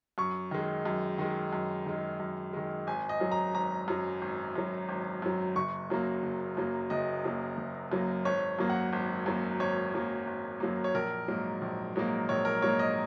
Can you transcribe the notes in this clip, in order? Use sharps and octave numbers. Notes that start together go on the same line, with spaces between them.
F#2 C#6
D#3 G#3
F#2
D#3 G#3
F#2
D#3 G#3
F#2
D#3 G#3
G#1 G#5
D#5
F#2 F#3
A#5
G#1 A#5
F#2 F#3
G#1
F#2 F#3
G#1
F#2 F#3
F#1 C#6
F#2 F#3 A#3
F#1
F#2 F#3 A#3
F#1 D#5
F#2 F#3 A#3
F#1
F#2 F#3 A#3
G#1 C#5
F#2 F#3 A#3
F#5
G#1
F#2 F#3 A#3
G#1 C#5
F#2 F#3 A#3
G#1
F#2 F#3 A#3
C#5
A#1 A#4
G#2 F#3 A#3
A#1
G#2 F#3 A#3
A#1 C#5
A#4
G#2 F#3 A#3 C#5
D#5